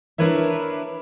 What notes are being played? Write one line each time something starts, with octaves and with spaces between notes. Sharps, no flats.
D4 E4 A#4 B4 C#5 E5